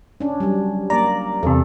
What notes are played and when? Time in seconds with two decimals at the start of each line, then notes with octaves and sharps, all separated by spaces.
0.20 C#4 D4
0.40 F#3 G3
0.90 A#3 D5 A#5
1.43 E2 C3 A4